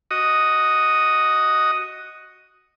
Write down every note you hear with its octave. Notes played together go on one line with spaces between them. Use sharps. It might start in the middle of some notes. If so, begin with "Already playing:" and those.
F#4 D#5 D#6